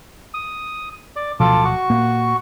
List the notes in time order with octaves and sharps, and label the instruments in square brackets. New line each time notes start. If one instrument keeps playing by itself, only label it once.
[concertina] D#6
D5
[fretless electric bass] D1 B2 F3 [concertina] F4 A4 D6
[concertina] F#4 C#6
[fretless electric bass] A#2 A#3